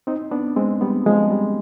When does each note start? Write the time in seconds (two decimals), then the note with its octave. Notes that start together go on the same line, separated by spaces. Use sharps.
0.07 C4 D#4
0.31 B3 D4
0.56 G#3 C4
0.81 G3 B3
1.06 F3 G#3
1.31 G3